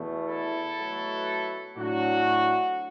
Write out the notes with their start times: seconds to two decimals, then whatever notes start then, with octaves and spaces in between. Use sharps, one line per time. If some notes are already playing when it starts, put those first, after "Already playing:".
Already playing: E2 B2 A3
0.27 E4 A4
0.77 B2 F#3 A3
1.76 A2 F#3 A3 D4 F#4